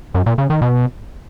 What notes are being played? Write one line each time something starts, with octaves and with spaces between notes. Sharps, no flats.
F#2
A#2
C#3
D#3
B2